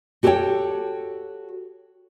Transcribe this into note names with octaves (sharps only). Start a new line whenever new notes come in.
F#4 G4 A4 B4 C#5 G5